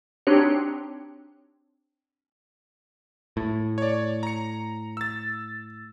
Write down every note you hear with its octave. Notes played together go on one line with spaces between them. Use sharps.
C4 D4 D#4 F#4 G4 C#5
A2
C#5 D5
A#5 C#7
E6 A6